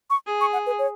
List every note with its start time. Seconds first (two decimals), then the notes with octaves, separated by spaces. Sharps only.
0.10 C#6
0.27 G#4
0.41 C#6
0.53 F#5
0.66 B4
0.79 C#5